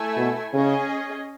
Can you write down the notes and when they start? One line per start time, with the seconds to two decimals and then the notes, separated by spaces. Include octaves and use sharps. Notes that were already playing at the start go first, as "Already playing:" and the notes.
Already playing: A3 E4 A4 E5 G#5
0.17 B2
0.53 C#3 C#4 G#4 D#5